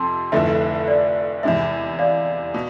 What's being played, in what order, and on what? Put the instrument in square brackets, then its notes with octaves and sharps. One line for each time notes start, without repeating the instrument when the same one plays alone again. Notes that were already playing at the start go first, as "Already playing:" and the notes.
Already playing: [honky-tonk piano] F2 C3 F3 [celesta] A5 C6
[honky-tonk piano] F1 F2 D3 A3 E4 [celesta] E5
[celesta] D5
[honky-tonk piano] E2 C3 G#3 [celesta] E5
[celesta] D5 F5
[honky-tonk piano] B2